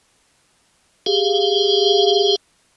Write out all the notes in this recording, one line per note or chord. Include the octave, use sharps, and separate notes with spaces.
G4 G#4 F5